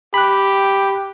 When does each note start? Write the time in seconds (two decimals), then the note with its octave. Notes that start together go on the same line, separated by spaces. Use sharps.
0.14 G4 B5 F#6